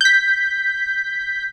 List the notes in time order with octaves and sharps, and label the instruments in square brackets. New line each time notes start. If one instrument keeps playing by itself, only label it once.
[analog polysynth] G6 B6